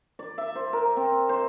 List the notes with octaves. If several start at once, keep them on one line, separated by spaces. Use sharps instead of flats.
D5
E5
C5
A#4
C4
C5